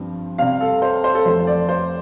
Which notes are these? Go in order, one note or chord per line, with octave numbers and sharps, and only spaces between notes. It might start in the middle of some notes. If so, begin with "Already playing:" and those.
Already playing: G2 F3 C4
C3 G3 C4 F5
A4
C5
C5
A4
F2 F3 A3 C5
D5
C5